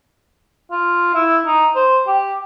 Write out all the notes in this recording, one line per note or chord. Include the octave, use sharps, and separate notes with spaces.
F4
E4
D#4
C5
G4